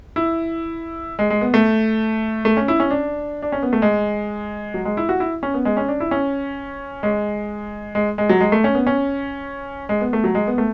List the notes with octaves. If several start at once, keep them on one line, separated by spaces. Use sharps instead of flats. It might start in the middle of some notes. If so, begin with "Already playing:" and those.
E4
G#3
G#3
B3
A3
A3
C#4
E4
C#4
D4
D4
C#4
B3
A3
G#3
F#3
G#3
E4
F#4
E4
C#4
B3
G#3
C#4
D4
E4
C#4
G#3
G#3
G#3
F#3
G#3
A3
C#4
B3
C#4
G#3
B3
A3
F#3
G#3
B3
A3